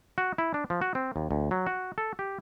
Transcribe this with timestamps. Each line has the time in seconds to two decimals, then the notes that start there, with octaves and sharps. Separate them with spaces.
0.18 F#4
0.38 E4
0.54 D4
0.70 F3
0.81 F#4
0.95 C4
1.16 D#2
1.31 D2
1.51 F#3
1.67 F#4
1.98 A4
2.19 G4